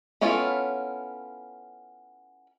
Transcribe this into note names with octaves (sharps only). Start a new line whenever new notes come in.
B3 C#4 E4 F4 A4